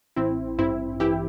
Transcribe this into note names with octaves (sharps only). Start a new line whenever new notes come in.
A1 C4 E4
G2 C4 E4
E3 E4 G4